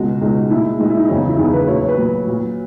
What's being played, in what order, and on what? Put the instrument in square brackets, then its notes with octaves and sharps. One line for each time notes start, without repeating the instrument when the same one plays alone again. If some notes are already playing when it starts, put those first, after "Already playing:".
Already playing: [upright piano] C#2 B2 G#3 F#4
C#2 B2 G#3 D#4
A#2 G#3 E4
D#4
A#2 G#3 D#4
E4
D#4
E2 C#3 F#3 C#4
D#4
E4
E2 C#3 F#3 G#4
B4
A#2 F#3 C#5
C#5
B4
A#2 F#3
A#2 F#3